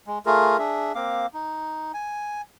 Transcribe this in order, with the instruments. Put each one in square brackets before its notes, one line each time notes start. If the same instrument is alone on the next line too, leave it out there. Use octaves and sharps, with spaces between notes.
[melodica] G#3
A3 F4 G#4 A#4
D4 G#4 E5
A#3 C4 F5 D6
D#4
G#5